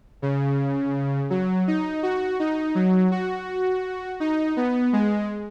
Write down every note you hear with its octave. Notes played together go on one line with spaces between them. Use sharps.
C#3
F#3
D#4
F#4
D#4
F#3
F#4
D#4
B3
G#3